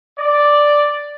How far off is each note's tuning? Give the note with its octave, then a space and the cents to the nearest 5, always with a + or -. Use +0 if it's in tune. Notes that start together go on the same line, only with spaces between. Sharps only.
D5 +0